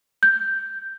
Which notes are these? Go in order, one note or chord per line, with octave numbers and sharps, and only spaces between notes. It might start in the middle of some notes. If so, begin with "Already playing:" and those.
G6